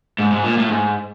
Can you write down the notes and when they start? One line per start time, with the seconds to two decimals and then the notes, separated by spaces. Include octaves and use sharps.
0.19 G#2
0.32 G#2
0.44 A#2
0.58 A2
0.70 G#2